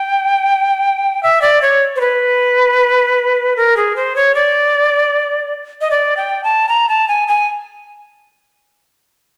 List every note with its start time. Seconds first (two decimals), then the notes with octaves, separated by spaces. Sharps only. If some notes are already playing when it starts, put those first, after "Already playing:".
Already playing: G5
1.23 E5
1.42 D5
1.62 C#5
1.96 C5
2.01 B4
3.56 A#4
3.77 G#4
3.96 C5
4.16 C#5
4.35 D5
5.81 D#5
5.91 D5
6.17 G5
6.44 A5
6.69 A#5
6.89 A5
7.08 G#5
7.28 G#5